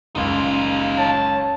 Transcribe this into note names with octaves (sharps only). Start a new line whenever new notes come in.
F#1 C#2 D#4 F4
C#5 A5